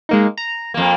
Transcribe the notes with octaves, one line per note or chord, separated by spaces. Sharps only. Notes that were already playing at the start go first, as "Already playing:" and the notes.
G#3 A#3 D#4
A#5
F2 A#3